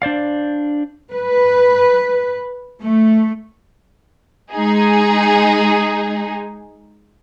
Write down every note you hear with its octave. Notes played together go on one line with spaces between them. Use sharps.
D4 C5 D5 F5
B4
A3
G#3 D#4 G#4